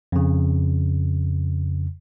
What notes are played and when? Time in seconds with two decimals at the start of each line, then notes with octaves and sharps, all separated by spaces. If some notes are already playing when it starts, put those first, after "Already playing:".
0.12 F2 C#3